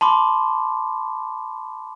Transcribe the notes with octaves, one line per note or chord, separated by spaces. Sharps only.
A5 B5 C6 D6